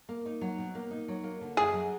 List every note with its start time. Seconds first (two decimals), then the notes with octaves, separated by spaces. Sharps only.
0.09 A#3
0.26 D#4
0.41 F#3
0.58 B2
0.75 A#3
0.91 D#4
1.08 F#3
1.24 A#3
1.41 D3
1.57 F#2 G#4
1.74 F#3